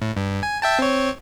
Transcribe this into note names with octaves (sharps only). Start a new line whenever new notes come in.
A2
G2
G#5
E5 G5 A5
C4 C#5